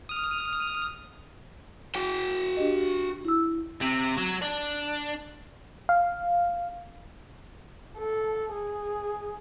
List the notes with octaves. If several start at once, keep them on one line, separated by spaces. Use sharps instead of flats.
D#6 F6
F#4 G5
D4 G4 D#5
E4 E6
C3
F#3
D4
F5
A4
G#4